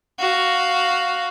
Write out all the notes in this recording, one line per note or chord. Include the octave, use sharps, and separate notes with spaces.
F#4 F5